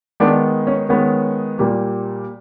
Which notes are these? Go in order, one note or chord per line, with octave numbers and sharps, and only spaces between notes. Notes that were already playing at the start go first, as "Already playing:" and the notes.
D#3 G#3 B3 D4
C#4
D#3 G#3 B3 C#4
A#2 G3 A#3